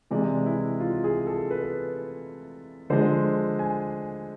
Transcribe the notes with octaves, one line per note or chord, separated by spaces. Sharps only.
C3 E3 G#3 D5
E4
F4
G#4
A4
B4
D3 F3 G#3 C5
G#5